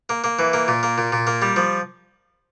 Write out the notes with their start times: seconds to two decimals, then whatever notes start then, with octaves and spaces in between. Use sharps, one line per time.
0.09 A#3
0.24 A#3
0.39 E3
0.53 A#3
0.68 A#2
0.83 A#3
0.98 A#2
1.12 A#2
1.27 A#3
1.42 G3
1.56 F3